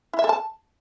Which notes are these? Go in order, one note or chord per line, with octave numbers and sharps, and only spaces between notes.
E4
E5
A4
A5